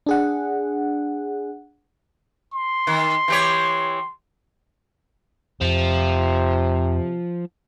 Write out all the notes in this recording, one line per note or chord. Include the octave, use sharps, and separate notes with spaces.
D4 G#4 F#5
C6
D#3
E3 G4 C#5
F2 C3 F3